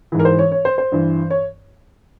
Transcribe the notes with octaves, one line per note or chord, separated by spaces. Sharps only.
G#2 E3
A#4
C5
C#5
C#5
C5
C5
G2 E3
C#5